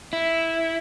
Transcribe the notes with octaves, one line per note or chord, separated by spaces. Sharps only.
E4